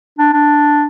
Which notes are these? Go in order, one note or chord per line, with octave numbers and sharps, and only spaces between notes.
D4
D4